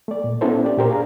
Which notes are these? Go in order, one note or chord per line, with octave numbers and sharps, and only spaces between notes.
A3 D5
A#2
B3 C#4 D4 E4 A4 C5
D4 G4 D5
A#2 G4 A#4 C5
D4 G#4 F5 A#5